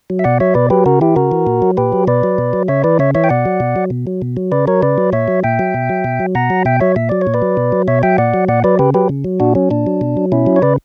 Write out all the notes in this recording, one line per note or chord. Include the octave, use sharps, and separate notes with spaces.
F#3
E5
B2 D5 F#5
F#3 C#5 E5
B2 B4 D5
F#3 G4 B4
C#3 F#4 A#4
E3 E4 G4
C#3 F#4 A#4
E3
A#2
F#3
A#2 G4 B4
F#3
B2 B4 D5
F#3
B2
F#3
C#3 C#5 E5
E3 B4 D5
C#3 C#5 E5
E3 C#5 E5
G5
B2 D5 F#5
F#3
B2
F#3
B2
F#3
B2
F#3
C#3 B4 D5
F#3 A#4 C#5
C#3 B4 D5
F#3
A#2 C#5 E5
F#3
A#2 E5 G5
F#3
B2
F#3
B2
F#3
B2 F#5 A#5
F#3
B2 E5 G5
F#3 C#5 E5
A#2 E5
F#3 D5
C#5
A#2
B4 D5
F#3
B2
F#3
B2 C#5 E5
F#3 E5 G5
A#2 D5 F#5
F#3
A#2 D5 F#5
F#3 B4 D5
C#3 G4 B4
F#3 G4 B4
C#3
F#3
A#2 D4 F#4
F#3 C#4
A#2 D4
F#3
B2
F#3
B2 C#4 E4
F#3
C#5
C#3 B4 D5